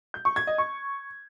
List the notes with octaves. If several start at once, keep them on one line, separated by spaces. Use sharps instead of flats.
G6
C#6
G#6
D#5
C#6